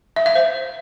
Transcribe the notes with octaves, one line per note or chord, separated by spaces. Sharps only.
E5
F5
C5